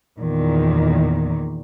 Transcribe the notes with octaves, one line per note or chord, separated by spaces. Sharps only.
E2 A#2 D#3